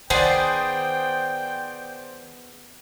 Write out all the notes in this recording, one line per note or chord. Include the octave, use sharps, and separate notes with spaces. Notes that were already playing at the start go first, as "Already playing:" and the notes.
D#3 B3 G#4 C5 D5 G5